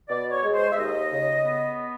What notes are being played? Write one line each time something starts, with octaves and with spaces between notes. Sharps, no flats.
B2 D5
C#5
G#3
C5
E5
D#2 D#5
C#3
B3